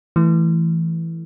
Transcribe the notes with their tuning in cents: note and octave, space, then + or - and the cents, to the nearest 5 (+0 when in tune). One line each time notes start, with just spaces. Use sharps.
E3 +0 A3 +0